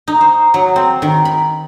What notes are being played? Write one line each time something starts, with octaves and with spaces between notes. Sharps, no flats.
D#4
C5
F#3
C4
D#3
B5